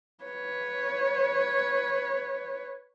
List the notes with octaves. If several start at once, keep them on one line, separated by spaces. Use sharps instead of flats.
B4 C#5